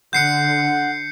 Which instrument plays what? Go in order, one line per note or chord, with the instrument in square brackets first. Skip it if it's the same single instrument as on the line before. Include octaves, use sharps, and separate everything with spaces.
[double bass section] D3 [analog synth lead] F#5 [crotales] G6 C7 C#7